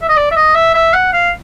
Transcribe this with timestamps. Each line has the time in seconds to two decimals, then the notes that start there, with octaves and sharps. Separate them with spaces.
0.01 E5
0.09 D#5
0.16 D5
0.31 E5
0.36 D#5
0.55 E5
0.75 E5
0.94 F#5
1.13 F5